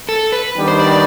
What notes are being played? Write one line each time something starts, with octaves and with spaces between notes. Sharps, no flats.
A4
B4
D#3 G3 B3 D4 G4
C5
D5
D5